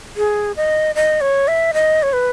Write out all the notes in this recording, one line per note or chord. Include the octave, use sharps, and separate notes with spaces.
G#4
D#5
D#5
C#5
E5
D#5
C#5
B4